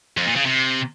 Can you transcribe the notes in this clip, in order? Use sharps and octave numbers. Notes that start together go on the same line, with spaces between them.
F2
A#2
C#3
C3